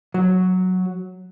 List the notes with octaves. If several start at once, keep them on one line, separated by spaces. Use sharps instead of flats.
F#3